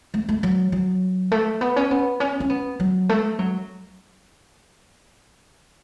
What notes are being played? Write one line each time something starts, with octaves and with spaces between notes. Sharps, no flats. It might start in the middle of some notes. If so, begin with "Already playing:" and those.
A3
A3
F#3
F#3
A3
B3
C#4
B3
C#4
C#4
B3
F#3
A3
F#3